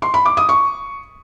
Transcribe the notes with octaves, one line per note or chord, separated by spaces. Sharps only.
C6
B5
D6
D#6
C#6